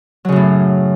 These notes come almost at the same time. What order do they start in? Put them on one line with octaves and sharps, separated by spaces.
F#3 C#3 F#2 A2